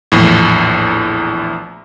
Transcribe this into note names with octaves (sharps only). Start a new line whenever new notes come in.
A#1 E2 A2